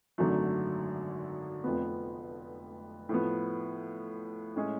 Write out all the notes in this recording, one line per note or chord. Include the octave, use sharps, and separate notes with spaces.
G#1 F#2 D3 F#3 A3
F1 F2 F3 B3
A2 F3 B3
A2 G#3 C#4 G#4